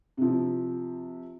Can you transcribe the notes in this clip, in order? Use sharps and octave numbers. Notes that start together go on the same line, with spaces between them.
C3 F3